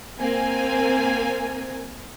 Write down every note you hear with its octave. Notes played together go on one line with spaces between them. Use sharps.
A#3 C4 G#5